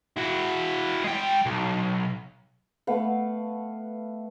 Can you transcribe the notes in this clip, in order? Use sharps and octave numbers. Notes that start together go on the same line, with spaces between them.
E4 F#4
G#3 G5
B1
A3 B3 F5